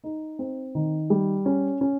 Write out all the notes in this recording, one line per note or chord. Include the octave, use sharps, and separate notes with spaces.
D#4
C4
D#3
G3
C#4
C#4